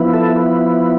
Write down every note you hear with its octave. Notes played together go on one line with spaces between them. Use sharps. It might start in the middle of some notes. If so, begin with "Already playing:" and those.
Already playing: F3 B3 E4
A4